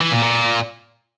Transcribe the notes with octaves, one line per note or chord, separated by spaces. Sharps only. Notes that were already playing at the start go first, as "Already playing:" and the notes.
E3
A#2
A#2